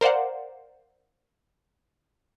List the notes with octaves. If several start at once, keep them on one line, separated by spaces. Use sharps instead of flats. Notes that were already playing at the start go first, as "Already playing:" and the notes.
A#4 C5 D5 F5 F#5